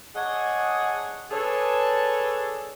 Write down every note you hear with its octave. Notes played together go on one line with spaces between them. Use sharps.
D4 G#4 C#5 D#5 F#5
D4 G#4 A4 B4 C#5